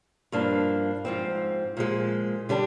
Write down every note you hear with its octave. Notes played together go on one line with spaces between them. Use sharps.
G2 F3 A#3 D4
G#2 F3 C4
A#2 F3 G#3
D3 G3 D4